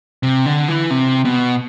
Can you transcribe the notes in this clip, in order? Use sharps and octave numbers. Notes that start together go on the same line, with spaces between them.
C3
D3
E3
C3
B2